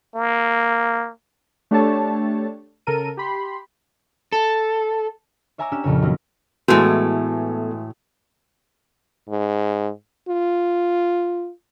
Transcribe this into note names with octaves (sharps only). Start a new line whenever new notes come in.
A#3
A3 D4 G4 A4 C#5 A5
C#3 A4 A#4 D#7
G4 B5 C6
A4
C#5 E5 G#5 A#5 D6 E6
C#4 D4 G4 E6 E7
F2 A#2 C#3 C#5
D#3 F#3 A#3 C4 C#4
A2 E3 G#3 A3 B3 F#4 A4 G#5
G#2
F4